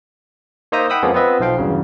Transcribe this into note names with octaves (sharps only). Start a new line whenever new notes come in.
A#3 D#4 C5 E5 A#5 D#6
F#5 G5 B5 D#6 E6
F2 F3 G#3 A#3 B3 C#4
B3 C4 F4 B4 D#5 E5
B1 F3 C5 F5 G5
E2 G2 C#3 F#3